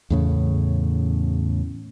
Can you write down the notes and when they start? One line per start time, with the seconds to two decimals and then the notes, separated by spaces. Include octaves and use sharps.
0.10 E2 A2 C#3